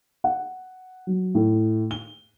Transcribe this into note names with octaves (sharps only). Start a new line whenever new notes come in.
F#5
F#3
A2
G7